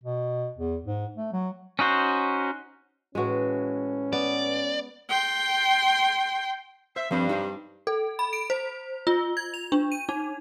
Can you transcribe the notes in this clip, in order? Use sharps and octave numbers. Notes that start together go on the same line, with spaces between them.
B2
E2
G#2
A3
F#3
C#4 D#4 F#4 C5
A2 E3 G#3 C#4 F#4
B3 D5
G5 C6
C5 E5
G2 F3 C4 B5
D#4 G4 C5
A4
B5
D7
C5
F4
G#6
F7
D4
D#7
D#4